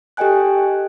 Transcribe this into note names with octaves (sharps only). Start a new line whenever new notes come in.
G4 A4 D#5 G5 G#5 F#6